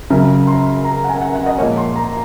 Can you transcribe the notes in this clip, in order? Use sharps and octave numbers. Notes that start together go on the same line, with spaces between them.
F#2 C#3 F#3
C6
A#5
F#5
G#5
F#5
F#5
D#5
A#2 F3 G#3 C#5
C6
A#5